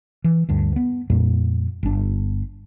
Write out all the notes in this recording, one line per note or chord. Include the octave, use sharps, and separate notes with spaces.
E3
D2 G2
B3
F2 A#2 G3 A#3
G1 D4